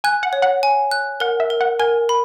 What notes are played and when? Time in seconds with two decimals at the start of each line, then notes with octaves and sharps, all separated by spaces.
0.04 G#5 F#6
0.23 F#5
0.33 C#5
0.42 F#5
0.63 G#5
0.91 F#6
1.20 A#4 F#5
1.40 E5
1.50 A#4
1.61 F#5
1.79 A#4 G#5
2.09 B5